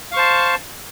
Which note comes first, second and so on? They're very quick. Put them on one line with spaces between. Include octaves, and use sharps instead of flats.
F5 C#6 C5 A5